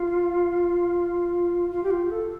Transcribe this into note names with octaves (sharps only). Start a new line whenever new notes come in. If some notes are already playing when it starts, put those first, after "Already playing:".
Already playing: F4
F4
G4
F4
A4